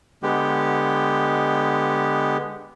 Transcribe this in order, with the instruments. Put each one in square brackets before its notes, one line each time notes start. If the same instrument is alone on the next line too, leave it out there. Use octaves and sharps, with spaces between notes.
[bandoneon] D3 G#3 B3 G4